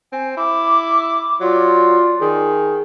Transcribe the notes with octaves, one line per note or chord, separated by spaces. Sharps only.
C4 G#5
E4 D6
F#3 F4 D5
D#3 G#4